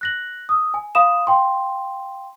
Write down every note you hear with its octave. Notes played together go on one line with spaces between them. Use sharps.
F#6 A#6 F#7
D#6 E6
G#5
F5 B5 D#6 E7
F5 G5 C6